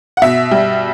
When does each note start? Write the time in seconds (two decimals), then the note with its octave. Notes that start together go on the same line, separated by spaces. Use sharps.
0.17 F#5
0.22 B2 E5
0.51 G3